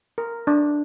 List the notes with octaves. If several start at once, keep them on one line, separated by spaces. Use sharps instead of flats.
A#4
D4